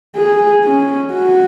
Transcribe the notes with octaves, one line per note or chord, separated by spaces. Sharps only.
G#4
C#4
F#4